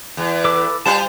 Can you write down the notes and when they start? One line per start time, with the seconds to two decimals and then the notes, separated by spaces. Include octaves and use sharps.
0.17 E2
0.45 A4 B4 D6
0.86 G3 F4 C5 A5